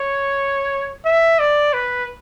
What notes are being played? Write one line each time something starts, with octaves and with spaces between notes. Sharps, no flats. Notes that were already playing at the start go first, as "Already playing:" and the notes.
Already playing: C#5
E5
D5
B4